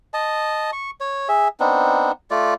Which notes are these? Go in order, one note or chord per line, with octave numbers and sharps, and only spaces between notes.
D#5 A5
C#6
C#5
G#4 E5
B3 C4 D4 D#4
A3 F4 D5